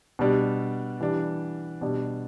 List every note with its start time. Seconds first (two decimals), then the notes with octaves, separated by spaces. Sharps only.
0.19 B2 G3 D4
1.00 E3 G3 D4
1.81 B2 G3 D4